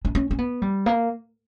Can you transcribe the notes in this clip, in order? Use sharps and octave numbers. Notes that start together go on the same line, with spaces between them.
D4
C#4
C#4
B3
G3
A#3